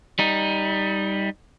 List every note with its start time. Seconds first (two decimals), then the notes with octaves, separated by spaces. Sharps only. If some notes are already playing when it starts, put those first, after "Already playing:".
0.19 G3 D#4